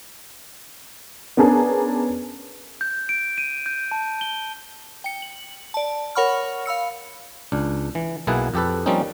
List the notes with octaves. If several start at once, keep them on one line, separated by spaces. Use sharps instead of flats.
B3 C#4 D4 G#4 A#4
G6
D7
D#7
G6
A5
G7
G5 C#7
F#7
D5 A5
A#4 C#5 F#5 B5 C#6 F6
F5 B5 E6 C#7
C#2 D4
E3
B1 B2 A#3 E4 G#4 F#5
F2 G4 A4 B4
F3 G3 A#3 C4 C#4 D#4